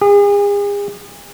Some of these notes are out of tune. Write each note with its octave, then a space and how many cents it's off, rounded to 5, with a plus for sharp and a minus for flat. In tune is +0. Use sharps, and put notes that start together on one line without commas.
G#4 -40